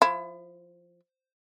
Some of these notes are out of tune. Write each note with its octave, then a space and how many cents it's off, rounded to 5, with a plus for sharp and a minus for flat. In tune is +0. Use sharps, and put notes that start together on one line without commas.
F3 +0 E4 +25